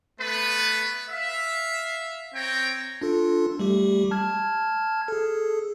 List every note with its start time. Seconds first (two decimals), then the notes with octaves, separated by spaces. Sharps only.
0.20 A3 B3 B4
1.10 E5 F5
2.34 C4 C#5 G5 A#5
3.02 D4 F4 A4
3.59 G3 A3 G4
4.11 A5 F6 G#6
5.08 G#4 A4